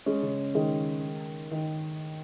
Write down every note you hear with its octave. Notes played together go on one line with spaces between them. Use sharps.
G#3 C#4
C#3
D#3 G#3
D#3